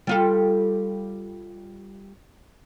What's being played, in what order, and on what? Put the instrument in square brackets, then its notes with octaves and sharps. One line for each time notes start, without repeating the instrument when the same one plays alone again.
[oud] G3 F4 A4